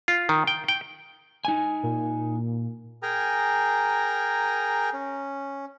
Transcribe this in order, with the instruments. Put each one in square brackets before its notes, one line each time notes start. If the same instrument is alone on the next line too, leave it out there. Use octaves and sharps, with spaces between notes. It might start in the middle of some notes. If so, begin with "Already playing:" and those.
[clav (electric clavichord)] F4
D#3
G5
G5
[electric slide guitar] D#4 G#5
[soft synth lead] A#2
[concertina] G#4 A#4 G5 G#5 A#5
C#4